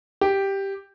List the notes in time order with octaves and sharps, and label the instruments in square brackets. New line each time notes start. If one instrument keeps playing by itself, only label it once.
[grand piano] G4